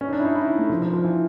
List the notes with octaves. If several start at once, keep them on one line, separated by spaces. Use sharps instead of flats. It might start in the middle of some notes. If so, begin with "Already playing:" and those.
C#4
D#4
D4
E4
D#4
E4
D#4
A3
F3
F3
F3
E3